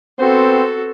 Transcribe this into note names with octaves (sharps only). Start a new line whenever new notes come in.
B3 C4 F#4 A4 C5